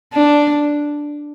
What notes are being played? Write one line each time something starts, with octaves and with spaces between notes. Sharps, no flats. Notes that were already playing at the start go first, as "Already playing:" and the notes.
D4